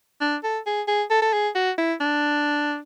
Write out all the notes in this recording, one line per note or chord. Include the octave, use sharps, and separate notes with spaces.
D4
A4
G#4
G#4
A4
A4
G#4
F#4
E4
D4